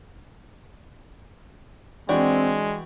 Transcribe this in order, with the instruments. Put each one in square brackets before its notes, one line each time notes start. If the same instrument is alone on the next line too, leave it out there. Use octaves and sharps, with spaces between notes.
[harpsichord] E3 F#4 G5 [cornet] G#3 [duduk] C4 [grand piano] D4